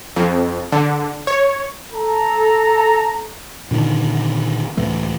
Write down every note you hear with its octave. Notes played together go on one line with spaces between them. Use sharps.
F2
D3
C#5
A4 A#5
A#2 D3 D#3
C#2 A2 E3 A3